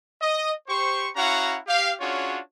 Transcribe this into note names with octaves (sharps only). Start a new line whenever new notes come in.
D#5
G4 C5 C#6
C#4 E4 F#4 F5 F#5 A#5
G4 F5
C#4 D4 F4 F#4 G#4 C#5